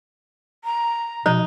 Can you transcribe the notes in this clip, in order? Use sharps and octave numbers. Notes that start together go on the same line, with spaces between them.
A#5
B2 F3 D#4